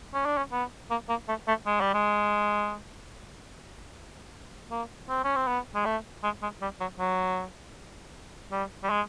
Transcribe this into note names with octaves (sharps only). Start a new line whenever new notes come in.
C#4
D4
C#4
B3
A#3
A#3
A3
A3
G#3
G3
G#3
A#3
C4
C#4
C4
B3
G#3
A3
G#3
G#3
G3
F#3
F#3
G3
G3
G#3